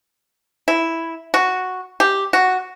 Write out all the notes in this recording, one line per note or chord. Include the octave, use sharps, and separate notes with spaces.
E4
F#4
G4
F#4